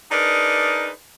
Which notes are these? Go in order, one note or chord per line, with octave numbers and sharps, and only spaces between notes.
D4 D#4 G#4 A#4 B4 D5